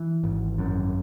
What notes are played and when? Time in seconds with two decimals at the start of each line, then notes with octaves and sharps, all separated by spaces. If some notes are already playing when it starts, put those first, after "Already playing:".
Already playing: E3
0.23 G#1
0.58 F#2